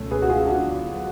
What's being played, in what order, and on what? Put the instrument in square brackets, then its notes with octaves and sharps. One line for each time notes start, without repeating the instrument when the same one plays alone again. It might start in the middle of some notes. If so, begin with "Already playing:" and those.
Already playing: [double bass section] C#2 B2 A3 C#4
[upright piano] G#4 B4
F#4
F4 G#4
D4 F#4
[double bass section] D2 D3 F#3 B3